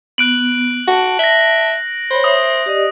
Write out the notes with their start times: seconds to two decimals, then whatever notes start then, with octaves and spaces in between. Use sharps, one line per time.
0.18 B3 F#6 D7 F#7
0.88 F#4 A5
1.19 E5 A#6 F#7
2.11 C5 C#5 B5
2.24 E5 D#6
2.66 G4 D5 D#5